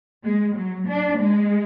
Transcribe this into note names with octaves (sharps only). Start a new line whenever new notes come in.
G#3
F#3
D4
G#3